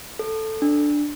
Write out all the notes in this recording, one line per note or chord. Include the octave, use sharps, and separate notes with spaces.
A4
D4